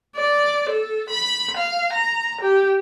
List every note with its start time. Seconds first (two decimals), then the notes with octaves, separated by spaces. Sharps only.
0.16 D5
0.69 A4
1.10 B5
1.57 F5
1.93 A#5
2.41 G4